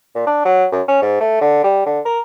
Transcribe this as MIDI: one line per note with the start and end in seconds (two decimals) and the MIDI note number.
0.15 0.23 46
0.27 0.43 62
0.45 0.66 54
0.72 0.82 42
0.88 1.01 61
1.02 1.19 44
1.20 1.38 57
1.41 1.62 50
1.64 1.84 55
1.86 2.00 50
2.05 2.19 70